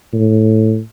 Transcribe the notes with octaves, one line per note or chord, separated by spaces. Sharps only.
A2